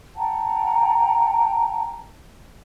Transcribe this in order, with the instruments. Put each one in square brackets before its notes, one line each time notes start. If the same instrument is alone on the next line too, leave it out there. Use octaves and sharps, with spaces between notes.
[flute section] F#5 G5 A5 A#5